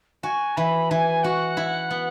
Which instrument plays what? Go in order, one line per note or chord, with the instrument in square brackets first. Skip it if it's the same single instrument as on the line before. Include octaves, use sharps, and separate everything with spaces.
[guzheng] F#4 [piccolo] G#5
[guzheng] E3 [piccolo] B5
[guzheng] E3 [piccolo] G#5
[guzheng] F#4 [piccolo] F#5
[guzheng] E4
B3